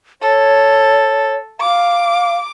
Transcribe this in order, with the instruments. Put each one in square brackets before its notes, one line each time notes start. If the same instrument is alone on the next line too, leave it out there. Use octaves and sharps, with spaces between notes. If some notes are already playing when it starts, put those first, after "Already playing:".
[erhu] A4 [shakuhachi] C#5
[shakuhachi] F5 [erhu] D6